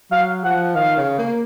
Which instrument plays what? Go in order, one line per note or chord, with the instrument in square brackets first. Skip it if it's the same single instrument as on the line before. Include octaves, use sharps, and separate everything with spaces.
[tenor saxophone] F#3 [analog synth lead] F5
[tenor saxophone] F3 [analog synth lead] F#5
[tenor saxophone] D#3 [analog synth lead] F5
[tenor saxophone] C#3
A#3